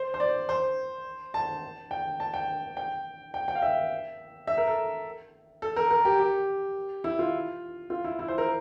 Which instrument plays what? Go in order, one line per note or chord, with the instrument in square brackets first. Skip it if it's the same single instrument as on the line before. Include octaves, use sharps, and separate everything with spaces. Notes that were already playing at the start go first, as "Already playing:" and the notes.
Already playing: [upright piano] C5
C5
D5
C5
A5
G5
A5
G5
G5
G5
G5
F5
E5
E5
A#4
A4
A4
A#4
A#4
G4
G4
E4
F4
F4
E4
E4
C5
A#4